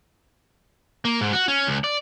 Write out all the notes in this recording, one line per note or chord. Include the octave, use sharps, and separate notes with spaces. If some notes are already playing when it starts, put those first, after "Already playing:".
A#3
G#2
F#4
C#4
C#2
D5